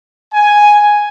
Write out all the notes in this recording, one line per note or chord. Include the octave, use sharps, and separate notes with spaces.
G#5